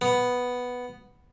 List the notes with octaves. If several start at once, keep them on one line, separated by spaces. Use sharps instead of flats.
B3